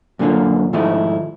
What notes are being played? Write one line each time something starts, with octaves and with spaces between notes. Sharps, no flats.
F#2 A#2 D3 A#3 F4
G#2 D#3 F3 A3 D#4 E4